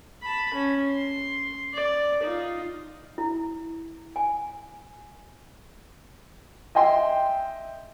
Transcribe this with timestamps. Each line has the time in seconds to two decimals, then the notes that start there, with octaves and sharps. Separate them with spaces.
0.22 A5 B5
0.54 C#4
0.90 C6
1.73 D5
2.22 D#4 F4
3.18 E4
4.16 G#5
6.75 D#5 E5 G5 C6